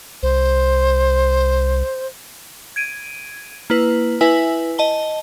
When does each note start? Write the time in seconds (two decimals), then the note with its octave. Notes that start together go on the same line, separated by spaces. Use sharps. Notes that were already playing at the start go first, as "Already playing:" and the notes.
0.23 C2 C5
2.76 G#6 D7 D#7
3.70 A#3 E4 B4
4.21 E4 B4 E5 G#5
4.78 D#5 A5 G7